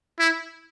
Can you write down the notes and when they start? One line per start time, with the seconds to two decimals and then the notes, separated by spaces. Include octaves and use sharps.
0.19 E4